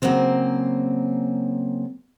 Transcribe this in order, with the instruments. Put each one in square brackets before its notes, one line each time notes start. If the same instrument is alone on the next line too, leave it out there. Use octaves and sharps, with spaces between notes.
[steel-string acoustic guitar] C#3 F#3 A#3 C4 C5